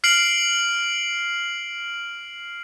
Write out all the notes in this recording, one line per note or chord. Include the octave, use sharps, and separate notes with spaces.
F6 C7 D7 F#7